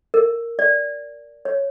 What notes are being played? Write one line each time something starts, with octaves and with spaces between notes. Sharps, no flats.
A#4
D5
C#5